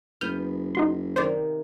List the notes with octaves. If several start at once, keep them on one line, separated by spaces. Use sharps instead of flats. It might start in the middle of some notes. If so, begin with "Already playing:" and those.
F#1 B3 F6 G6
F#1 D#4 F#4 C6
C3 D#3 A#3 C5 D5